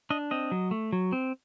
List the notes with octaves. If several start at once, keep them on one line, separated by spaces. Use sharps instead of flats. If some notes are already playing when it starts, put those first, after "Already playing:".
D4 D#5
C4 D#5
F#3
A3
F#3
C4